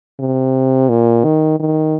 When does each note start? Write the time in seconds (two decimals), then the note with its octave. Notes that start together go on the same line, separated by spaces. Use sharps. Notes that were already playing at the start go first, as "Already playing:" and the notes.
0.20 C3
0.89 A#2
1.24 D#3
1.59 D#3